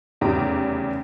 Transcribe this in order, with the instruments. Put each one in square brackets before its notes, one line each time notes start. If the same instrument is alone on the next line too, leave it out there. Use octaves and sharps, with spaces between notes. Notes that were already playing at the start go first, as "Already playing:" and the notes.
[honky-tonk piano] F1 E2 C#3 G4 A#5